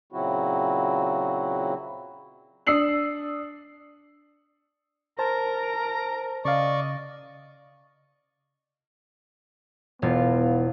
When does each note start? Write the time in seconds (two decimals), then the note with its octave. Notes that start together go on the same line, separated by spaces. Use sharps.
0.12 A#2 C#3 F#3 C4 E4 F#4
2.67 D4 D#6 E6 C7 C#7 F#7
5.19 A#4 C5 A5 A#5
6.45 C#3 D5 D#5 F5 C#6
10.02 E1 B3 F4